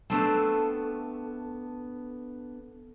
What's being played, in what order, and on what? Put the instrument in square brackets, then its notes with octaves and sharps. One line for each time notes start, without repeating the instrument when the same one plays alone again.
[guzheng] A3 C4 [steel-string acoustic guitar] B3 D4 A5